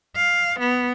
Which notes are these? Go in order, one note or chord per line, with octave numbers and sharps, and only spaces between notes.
F5
B3